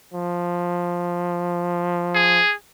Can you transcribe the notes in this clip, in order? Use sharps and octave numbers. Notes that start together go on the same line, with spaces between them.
F3
G#4